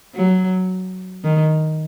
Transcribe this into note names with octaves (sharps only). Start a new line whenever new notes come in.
F#3
D#3